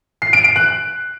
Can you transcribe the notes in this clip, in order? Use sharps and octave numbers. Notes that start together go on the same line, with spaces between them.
C7
D7
D7
F#6